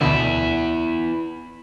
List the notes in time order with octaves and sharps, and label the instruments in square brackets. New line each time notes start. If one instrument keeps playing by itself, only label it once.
[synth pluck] D2 B2 D3 [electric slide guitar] B3 E4